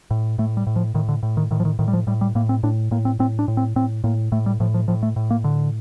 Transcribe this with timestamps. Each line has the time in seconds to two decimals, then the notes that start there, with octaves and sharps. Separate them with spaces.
0.11 A2
0.38 A2 A3
0.57 G3
0.67 A2
0.76 F3
0.94 A2 D#3
1.09 D3
1.23 A2
1.37 D#3
1.51 A2 D#3
1.60 F3
1.65 D#3
1.79 A2 D#3
1.88 G3
1.93 F3
2.07 A2 G3
2.21 G3
2.35 A2 A#3
2.49 C4
2.63 A2 D4
2.91 A2 A#3
3.05 C4
3.19 A2 C4
3.39 D4
3.48 A2
3.57 C4
3.76 A2 C4
4.04 A2 A#3
4.32 A2 A3
4.46 G3
4.60 A2 F3
4.74 F3
4.88 A2 F3
5.03 A3
5.16 A2
5.31 A#3
5.44 D3